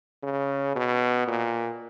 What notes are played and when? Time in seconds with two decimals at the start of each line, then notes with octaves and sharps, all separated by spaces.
0.23 C#3
0.75 B2
1.28 A#2